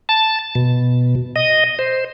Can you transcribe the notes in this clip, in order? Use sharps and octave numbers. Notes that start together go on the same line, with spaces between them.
A5
B2
D#5
C5